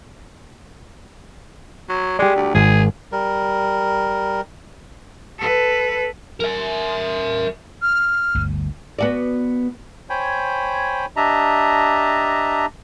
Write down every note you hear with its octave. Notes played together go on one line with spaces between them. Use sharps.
F#3
G#3 G4 D5
D2
G#1 G#4
G3 A#4
A4 B4
A#4 E5
F6
G1 D2 G2
B3 F#4 D5
C5 C#5 G5 G#5 B5
D4 G4 D#5 E5 A5 A#5